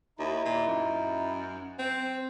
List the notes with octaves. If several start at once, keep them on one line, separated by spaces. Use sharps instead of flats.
D#2 D#4 E4
A#2
F#2
C4 C5